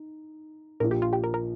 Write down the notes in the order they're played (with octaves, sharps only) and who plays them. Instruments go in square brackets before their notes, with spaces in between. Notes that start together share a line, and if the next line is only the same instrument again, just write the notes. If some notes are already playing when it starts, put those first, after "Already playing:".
Already playing: [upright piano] D#4
[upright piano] A#1 A#2 F3 [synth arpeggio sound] A#4
[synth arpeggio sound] G4
F4
G4
A#4
A#4